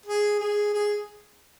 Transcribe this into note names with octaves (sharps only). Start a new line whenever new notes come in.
G#4
G#4
G#4